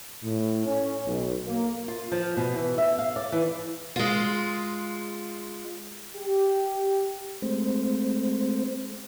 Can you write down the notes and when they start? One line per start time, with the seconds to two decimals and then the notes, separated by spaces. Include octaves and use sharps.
0.23 A2
0.65 C#4
1.06 B1
1.46 A#3
1.88 F4
2.12 F3
2.37 B2
2.54 E3
2.78 E5
2.99 F5
3.16 D5
3.32 E3
3.96 G#3 F4
6.16 G4
7.42 G#3 A3 C4 C5